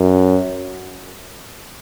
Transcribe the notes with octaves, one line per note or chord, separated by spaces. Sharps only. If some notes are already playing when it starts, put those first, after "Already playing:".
Already playing: F#2